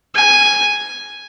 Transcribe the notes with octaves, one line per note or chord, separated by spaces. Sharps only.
G#5